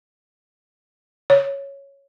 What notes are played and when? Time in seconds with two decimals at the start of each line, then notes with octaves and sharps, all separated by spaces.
1.30 C#5